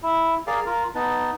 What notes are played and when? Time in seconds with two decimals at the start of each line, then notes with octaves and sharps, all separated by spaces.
0.03 E4
0.47 G#4 A#4 D5 F5
0.66 F4 A#4
0.95 B3 D#4 A5